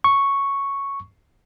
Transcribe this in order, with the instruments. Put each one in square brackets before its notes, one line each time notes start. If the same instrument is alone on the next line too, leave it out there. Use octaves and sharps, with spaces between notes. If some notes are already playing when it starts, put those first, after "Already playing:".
[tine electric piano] C#6